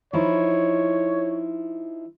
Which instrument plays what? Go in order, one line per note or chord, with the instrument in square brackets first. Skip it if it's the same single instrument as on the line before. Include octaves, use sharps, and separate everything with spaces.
[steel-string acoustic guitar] F3 D#4 E4 [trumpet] C#5